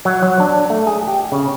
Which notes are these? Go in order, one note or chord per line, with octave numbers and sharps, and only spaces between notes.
F#3
F#3
D4
A3
G#4
G4
C#3